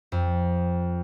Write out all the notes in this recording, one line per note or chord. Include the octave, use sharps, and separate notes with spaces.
F2